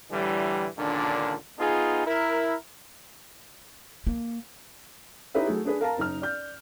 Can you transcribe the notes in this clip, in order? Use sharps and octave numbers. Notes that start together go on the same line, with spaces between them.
A2 D3 E3 G3
C#2 A#2 D3 D#3 D4
B3 D#4 F4 G#4
E4 A#4
A#3
D#4 E4 G4 B4 C#5 E5
F#3 A3 G#4
D4 G#4 B4
A#4 F5 A5 A#5
F#1 D#4 F6
D5 G6